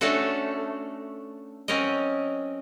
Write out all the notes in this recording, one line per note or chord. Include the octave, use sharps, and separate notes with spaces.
A3 C#4 D4 F#4 A4
F#3 C4 C#4 A#4 D#5